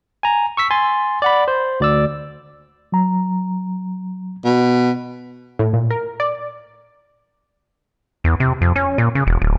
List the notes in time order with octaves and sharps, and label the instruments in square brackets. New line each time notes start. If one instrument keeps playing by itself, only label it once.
[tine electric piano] G#5 A#5
C#6 E6 B6
G#5 C6 A6
D5 F#5 B5
C5
D2 D5 E6
[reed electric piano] F#3 A#5
[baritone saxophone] B2
[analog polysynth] A2
A#2
A#4
D5
[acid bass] E2
C3
F2
C#4
A#2
C#3
E1
D1